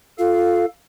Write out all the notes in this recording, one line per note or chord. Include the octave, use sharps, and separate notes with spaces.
F4 A4 F5